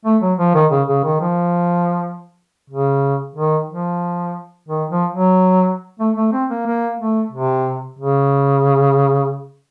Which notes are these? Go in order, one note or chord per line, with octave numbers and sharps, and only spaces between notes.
A3
F#3
F3
D#3
C#3
C#3
D#3
F3
C#3
D#3
F3
D#3
F3
F#3
A3
A3
C4
A#3
A#3
A3
C3
C#3